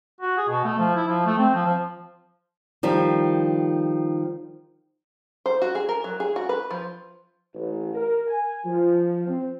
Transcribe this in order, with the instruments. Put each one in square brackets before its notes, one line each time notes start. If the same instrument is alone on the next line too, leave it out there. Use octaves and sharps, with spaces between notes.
[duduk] F#4
G#4
B2
A3
F3
E4
F3
A3
C4
F3
F3
[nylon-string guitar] D#3 F3 G3
[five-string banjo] C5
F#4
G#4
A#4
F#3
G#4
F#4
B4
F3
[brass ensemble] A1
A#4
G#5
F3
C4